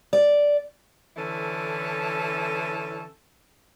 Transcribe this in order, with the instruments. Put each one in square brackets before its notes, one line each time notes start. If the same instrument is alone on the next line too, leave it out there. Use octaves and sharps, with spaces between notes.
[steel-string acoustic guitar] D5
[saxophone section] D3 E3 C#4 E4 A4